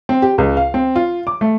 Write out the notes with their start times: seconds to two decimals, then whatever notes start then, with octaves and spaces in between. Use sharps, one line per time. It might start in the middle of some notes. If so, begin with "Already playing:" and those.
0.09 C4
0.22 G4
0.38 C#2
0.57 F5
0.74 C4
0.96 F4
1.27 D6
1.41 A3